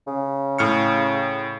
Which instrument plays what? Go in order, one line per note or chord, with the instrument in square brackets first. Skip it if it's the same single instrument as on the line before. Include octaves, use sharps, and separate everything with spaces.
[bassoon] C#3
[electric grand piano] A2 F6 C#7